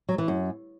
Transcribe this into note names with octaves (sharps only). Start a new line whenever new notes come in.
F#3
E3
F#2